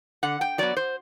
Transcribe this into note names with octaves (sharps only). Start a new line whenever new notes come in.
D3 F#5
G5
F#3 B3 D5
C5